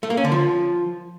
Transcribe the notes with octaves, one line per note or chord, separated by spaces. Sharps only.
A3
A#3
C#4
D3
F3